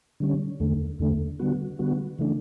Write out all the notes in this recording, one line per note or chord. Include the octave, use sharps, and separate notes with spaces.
D3 G3 C#4
E2 D3 A3
E2 D3 A3
D3 G3 B3 F#4
D3 G3 B3 F#4
C#3 E3 A3 D4